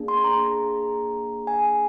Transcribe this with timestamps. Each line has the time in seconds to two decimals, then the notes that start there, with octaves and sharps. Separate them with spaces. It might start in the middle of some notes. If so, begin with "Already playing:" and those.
Already playing: A#3 D4 G#4
0.08 C6
0.24 A#5
1.47 G#5